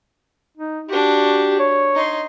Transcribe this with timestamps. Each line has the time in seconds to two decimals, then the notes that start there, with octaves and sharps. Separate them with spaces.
0.57 D#4
0.89 D4 F#4 G4
1.59 C#5
1.95 D#4 C6